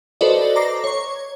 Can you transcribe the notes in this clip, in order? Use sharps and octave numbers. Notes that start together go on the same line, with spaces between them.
F#4 A4 B4 C5 D5 D#5
A#5 D6 A#6 C7
C#5 C#6